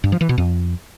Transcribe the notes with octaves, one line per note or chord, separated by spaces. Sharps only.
G2
F3
E3
B2
F2